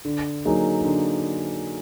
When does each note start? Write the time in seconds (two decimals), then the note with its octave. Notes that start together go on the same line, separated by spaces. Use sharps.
0.05 D3
0.45 F#3 A#3 D#4 G#4
0.84 D3